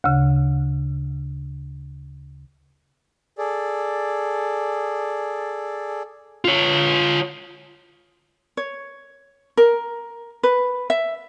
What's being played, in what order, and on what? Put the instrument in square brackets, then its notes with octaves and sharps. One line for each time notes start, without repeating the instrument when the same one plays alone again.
[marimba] D2 C#3
[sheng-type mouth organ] G#4 A4 D5
[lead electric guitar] F4 C#5
[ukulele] C#5
A#4
B4
E5